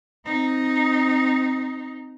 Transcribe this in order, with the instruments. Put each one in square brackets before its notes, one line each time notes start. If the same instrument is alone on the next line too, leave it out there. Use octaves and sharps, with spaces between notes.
[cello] C4 D#4